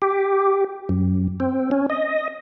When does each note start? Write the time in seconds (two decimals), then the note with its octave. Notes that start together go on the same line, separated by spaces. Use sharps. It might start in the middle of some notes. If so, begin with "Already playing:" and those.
0.02 G4
0.89 F#2
1.40 C4
1.71 C#4
1.90 D#5